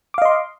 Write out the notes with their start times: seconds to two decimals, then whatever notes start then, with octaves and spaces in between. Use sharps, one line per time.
0.14 D6
0.18 F5
0.22 D#5
0.25 C6